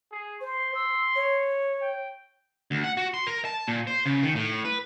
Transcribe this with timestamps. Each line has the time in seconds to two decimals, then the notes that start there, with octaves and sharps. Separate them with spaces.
0.12 G#4
0.41 C5 C6
0.75 E6
1.15 C#5
1.82 G5
2.71 D2
2.84 F#5
2.97 F#4
3.14 C6
3.27 A#4
3.45 A5
3.68 A#2
3.87 C5
4.06 C#3
4.23 D#3
4.35 A2
4.65 B4